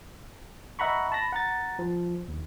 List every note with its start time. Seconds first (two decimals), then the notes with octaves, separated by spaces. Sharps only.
0.79 D#5 E5 F#5 A#5 B5 C#6
1.12 A5 B5 A#6
1.33 F#5 A#5 A6
1.79 F3
2.28 D#2